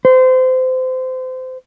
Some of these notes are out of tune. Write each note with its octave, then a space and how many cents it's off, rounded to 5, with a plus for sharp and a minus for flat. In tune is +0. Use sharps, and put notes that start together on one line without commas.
C5 -25